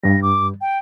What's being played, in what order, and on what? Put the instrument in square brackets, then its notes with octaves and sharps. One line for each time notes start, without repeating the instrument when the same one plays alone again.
[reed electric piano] G2 G3 [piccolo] A#6
[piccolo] D6
G5